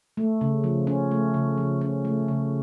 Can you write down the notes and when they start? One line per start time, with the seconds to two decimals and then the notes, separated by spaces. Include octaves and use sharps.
0.17 A3
0.41 C#3
0.64 F3
0.87 C#4
1.11 A3
1.34 C#3
1.58 F3
1.81 C#4
2.05 A3
2.28 C#3